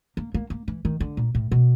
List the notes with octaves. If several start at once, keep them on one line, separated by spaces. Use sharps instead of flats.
A#3
A#3
A#3
E3
D#3
D3
A#2
A2
B2